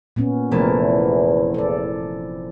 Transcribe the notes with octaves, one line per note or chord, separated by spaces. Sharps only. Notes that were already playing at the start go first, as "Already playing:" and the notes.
A#2 B3 C#4
F1 E2 E3 A3 E4 A#4 A5
A4 D5